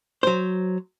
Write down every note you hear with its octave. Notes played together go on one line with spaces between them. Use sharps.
F#3 C5